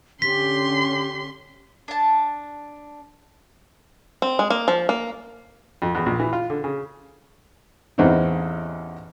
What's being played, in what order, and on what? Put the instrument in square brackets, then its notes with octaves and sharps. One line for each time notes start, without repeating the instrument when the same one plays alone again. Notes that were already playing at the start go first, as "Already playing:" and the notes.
[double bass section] D3 C#4 [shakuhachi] G4 [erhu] C6 [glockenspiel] B6
[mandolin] D4 A5
[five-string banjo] C4
G#3
A#3
F3
A#3
[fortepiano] F2
E2
A#1
E3
F4
D3
C#3
A1 E2 C4 D#4 E4